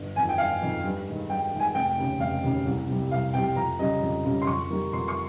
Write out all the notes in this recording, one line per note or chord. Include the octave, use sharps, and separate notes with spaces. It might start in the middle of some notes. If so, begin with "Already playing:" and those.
Already playing: G1
F2 D#3 G#5
G5
G1 F5
F2 D#3
G2
D#3 G#3
G2 G5
D#3 G#3
G#5
F1 G5
D#2 C#3
F1 F5
D#2 C#3
C2
C3 G3
C2 F5
C3 G3 G5
F2 A#5
C#3 G3 D#5
F2
C#3 G3
C6
F2 C#6
D#3 G3 A#3
F2 C6
C#6